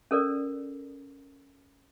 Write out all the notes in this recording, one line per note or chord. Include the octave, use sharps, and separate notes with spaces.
C#4 A4 A#4 D5